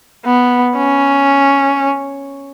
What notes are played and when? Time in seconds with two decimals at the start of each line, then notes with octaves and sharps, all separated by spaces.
0.25 B3
0.77 C#4